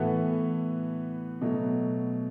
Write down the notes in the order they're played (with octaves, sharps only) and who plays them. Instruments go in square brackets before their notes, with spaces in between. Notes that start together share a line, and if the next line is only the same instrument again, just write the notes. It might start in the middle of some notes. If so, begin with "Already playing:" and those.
Already playing: [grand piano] A2 E3 B3 F#4 A4
B2 F#3 A3